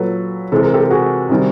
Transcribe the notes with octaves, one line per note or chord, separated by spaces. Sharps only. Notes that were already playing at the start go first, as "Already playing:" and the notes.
Already playing: A#2 F#3 A4 B4
C3 E3 G#3 A4
A#4
G4 A4
F#4 G#4
C3 D#3 G3